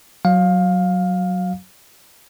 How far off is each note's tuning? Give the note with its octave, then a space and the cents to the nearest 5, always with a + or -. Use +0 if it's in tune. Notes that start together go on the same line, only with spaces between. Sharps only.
F#3 +0 F5 +15